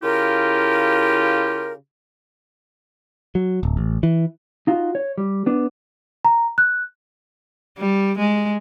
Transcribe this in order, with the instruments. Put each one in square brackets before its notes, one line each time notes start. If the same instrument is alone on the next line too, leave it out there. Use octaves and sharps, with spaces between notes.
[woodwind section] C#3 E4 F4 G4 A#4
[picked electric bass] F#3
D1
A1
E3
[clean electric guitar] D#4 F4 F#4
C#5
G3
B3 D4
[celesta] A#5
F#6
[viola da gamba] G3
G#3